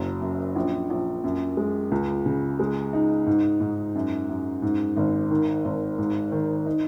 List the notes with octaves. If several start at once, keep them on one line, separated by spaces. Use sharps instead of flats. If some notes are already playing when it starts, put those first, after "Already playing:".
Already playing: F#1 F#3
F#2
A#1
A#1
F#2
G#3
C#2
C#3
G#3
D#4
G#2
G#2
F#2
F#2
G#2
G#1
D#3
G#1
G#2
D#3
D#4